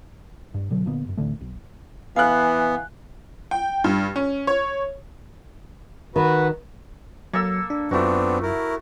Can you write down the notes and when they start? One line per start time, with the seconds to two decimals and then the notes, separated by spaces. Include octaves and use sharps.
0.54 G2
0.71 B2 D3 F#3
0.85 A#2 D3 A#3 B3
1.05 G1 F#2
1.17 D1 A1 D3 A3
1.41 B1
2.16 E3 B3 F5 G#5 F#6
3.51 G5
3.84 G2
4.16 C#4
4.47 C#5
6.16 D#3 F#4 B4
7.33 F#3 A#3 A4 E6
7.70 D4
7.91 F#2 A3 B3 C4 D4 F4 F#4
8.43 E4 A#4